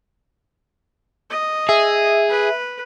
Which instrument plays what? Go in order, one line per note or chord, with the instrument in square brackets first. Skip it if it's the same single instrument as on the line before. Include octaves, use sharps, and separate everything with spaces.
[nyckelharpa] D#5
[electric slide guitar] G#4 [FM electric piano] E5
[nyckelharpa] B4